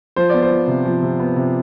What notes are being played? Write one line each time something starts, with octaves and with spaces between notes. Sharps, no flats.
F3 C5
B3 D5
C5
F3
C3
F3
C3
B3
C3